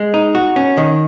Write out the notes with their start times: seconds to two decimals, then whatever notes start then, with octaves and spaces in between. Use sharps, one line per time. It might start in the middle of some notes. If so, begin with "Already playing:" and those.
Already playing: G#3
0.14 D#4
0.35 F#4
0.56 C#4
0.78 D#3